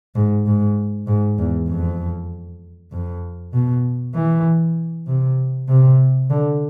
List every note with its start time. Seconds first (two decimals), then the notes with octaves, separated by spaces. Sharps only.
0.15 G#2
0.46 G#2
1.07 G#2
1.38 E2
1.69 F2
2.92 F2
3.53 B2
4.15 E3
5.07 C3
5.69 C3
6.30 D3